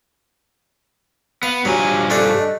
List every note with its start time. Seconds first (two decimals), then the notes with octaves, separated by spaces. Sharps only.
1.43 B3 F5
1.65 G2 F3 F#3 G4 G#5
2.10 A3 D4 F#5
2.39 D#5